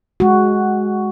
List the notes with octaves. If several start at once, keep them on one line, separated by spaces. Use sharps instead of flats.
G#3 F#4